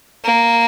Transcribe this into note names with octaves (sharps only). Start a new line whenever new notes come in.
A#3